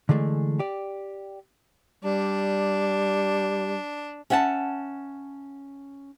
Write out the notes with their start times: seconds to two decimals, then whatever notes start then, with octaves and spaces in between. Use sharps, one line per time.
0.09 D3 E3 G#3 A3
0.59 G4 D5
2.04 G3 D4
4.30 C#4 E5 F#5 G5 A5